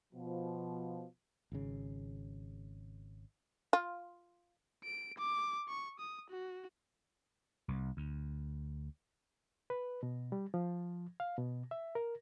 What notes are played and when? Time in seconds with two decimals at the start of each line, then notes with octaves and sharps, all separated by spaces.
0.13 B2 F3
1.52 G#1 C#3
3.73 F4
4.84 D7
5.18 D6
5.68 C#6
5.99 D#6
6.30 F#4
7.68 C2
7.97 D2
9.70 B4
10.03 B2
10.32 G3
10.54 F3
11.20 F5
11.38 B2
11.71 E5
11.95 A#4